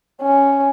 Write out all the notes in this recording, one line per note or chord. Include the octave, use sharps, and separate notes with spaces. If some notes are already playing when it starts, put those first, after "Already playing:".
C#4